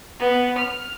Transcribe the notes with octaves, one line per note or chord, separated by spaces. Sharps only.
B3
F6